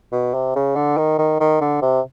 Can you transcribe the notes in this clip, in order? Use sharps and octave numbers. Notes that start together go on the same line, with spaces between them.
B2
C3
C#3
D3
D#3
D#3
D#3
D3
C3